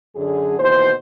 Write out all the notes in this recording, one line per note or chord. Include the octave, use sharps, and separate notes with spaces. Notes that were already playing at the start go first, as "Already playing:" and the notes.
F#2 D3 G#4
D#2 B2 E3 C5